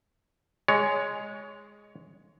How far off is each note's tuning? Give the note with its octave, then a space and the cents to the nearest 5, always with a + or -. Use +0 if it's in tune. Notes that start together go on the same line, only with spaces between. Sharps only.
G#3 +0 C#5 +15